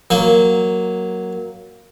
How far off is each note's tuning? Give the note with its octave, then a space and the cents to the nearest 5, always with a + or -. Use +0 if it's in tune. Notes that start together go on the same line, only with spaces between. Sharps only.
F#3 +0 A#3 +0